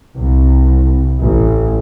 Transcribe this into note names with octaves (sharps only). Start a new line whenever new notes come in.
C2
A1